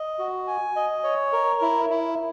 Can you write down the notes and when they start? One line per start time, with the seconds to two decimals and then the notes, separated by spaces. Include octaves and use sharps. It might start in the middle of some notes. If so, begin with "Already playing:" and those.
Already playing: D#5
0.19 F#4
0.47 G#5
0.76 D#5
1.03 C#5
1.33 A#4
1.62 E4
1.90 E4